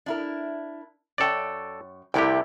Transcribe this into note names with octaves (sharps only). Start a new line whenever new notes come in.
D4 E4 A#4
F#2 A4 C#5 D5 G5
C2 C3 A3 E4 G4 G5